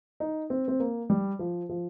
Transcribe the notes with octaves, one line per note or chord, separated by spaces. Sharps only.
D#4
C4
C4
A#3
G3
F3
F3